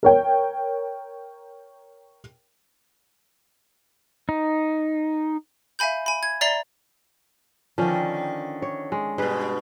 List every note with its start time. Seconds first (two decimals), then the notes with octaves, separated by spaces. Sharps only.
0.03 A#4 C#5 G5
4.29 D#4
5.79 E5 F5 G#5 B5 G6
6.06 G#5 B5
6.23 G#6
6.41 D5 E5 A#5 A6 C7 G7
7.78 D3 D#3 F3 C#4
8.62 C#5
8.92 G#3
9.18 G2 B2 G#4 B4